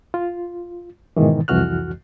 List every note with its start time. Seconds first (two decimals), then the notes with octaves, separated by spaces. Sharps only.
0.14 F4
1.17 G#2 B2 D#3 E3
1.48 C2 F2 E3 F#4 F6 F#6